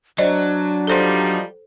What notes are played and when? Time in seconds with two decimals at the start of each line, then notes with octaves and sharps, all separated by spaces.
0.18 F#3 D4 C5 D5 D#5
0.87 F3 G3 D#4 A4 C5 C6